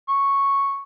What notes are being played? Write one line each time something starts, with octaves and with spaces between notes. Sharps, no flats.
C#6